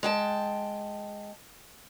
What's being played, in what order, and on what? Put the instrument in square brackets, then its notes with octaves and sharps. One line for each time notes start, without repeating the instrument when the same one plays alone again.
[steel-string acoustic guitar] G#3 G5 A5